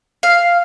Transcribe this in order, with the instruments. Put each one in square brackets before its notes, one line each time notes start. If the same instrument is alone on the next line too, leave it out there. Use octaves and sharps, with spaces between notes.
[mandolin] F5